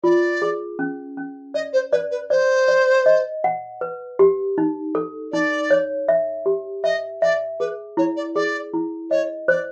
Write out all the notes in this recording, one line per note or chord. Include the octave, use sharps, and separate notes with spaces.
F4 D5
G#4
C#4
C#4
D5 D#5
C5
B4 D5
B4
C5 D5
D5
D#5
F#5
B4
G4
D#4
A4
D#4 D5
C#5
E5
G4
D#5 E5
D5 E5
G#4 B4
E4 C#5
D5
G#4 D5
E4
C#5 D#5
C5 D5